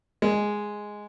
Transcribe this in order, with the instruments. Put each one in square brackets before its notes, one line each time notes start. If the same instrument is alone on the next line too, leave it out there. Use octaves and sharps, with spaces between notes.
[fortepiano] G#3